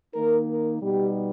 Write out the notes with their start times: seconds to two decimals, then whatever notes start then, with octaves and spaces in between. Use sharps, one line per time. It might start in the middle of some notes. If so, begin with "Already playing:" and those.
0.15 D#3 A#3 D#4 A#4
0.49 A#4
0.82 B2 G3 B3 D#4 G4